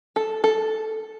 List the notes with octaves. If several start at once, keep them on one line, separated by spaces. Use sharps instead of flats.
A4
A4